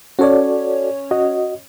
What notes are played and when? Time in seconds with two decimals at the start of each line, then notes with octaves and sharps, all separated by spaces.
0.19 C#4 F#4 A4 C#5 D5
1.11 F#4 D#5